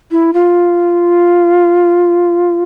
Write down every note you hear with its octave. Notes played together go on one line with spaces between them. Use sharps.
E4
F4